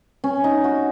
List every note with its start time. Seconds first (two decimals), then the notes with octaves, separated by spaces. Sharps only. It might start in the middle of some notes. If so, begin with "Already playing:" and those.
0.24 C#4
0.44 D#4
0.64 F#4